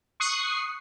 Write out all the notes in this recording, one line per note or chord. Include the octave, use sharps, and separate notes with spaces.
C#6 D#6 F#6 C7